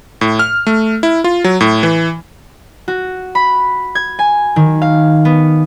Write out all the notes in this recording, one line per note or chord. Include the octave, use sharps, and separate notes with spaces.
A2
F6
A3
E4
F4
F#3
A2
E3
F#4
B5
G#6
G#5
D#3
F5
B3